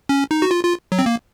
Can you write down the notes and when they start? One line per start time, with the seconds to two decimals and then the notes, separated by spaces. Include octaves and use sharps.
0.09 C#4
0.31 D#4
0.42 F#4
0.51 F4
0.64 F4
0.92 F#3
0.99 C4
1.06 A#3